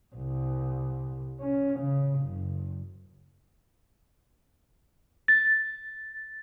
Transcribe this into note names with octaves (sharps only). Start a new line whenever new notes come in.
C2
C#4
C#3
F#1
A6